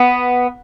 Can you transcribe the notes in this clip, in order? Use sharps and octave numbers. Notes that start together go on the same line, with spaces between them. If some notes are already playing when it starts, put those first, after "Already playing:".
Already playing: B3